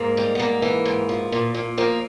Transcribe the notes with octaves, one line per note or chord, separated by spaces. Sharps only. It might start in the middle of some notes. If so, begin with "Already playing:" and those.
Already playing: G#2 A#3
G3
B3
G#2 A#3
E3
G#2
F3
A#2
A#2
F3 A#3